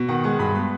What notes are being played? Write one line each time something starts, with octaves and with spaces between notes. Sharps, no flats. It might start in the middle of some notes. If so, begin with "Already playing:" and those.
Already playing: B2
D#3 F#5
G#3 F#5
G2 B5
B3 B5